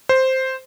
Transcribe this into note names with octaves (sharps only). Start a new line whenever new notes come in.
C5